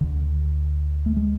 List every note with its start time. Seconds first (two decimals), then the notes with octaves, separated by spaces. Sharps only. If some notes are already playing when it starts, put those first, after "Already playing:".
0.01 D2 D3
1.06 A3
1.16 G#3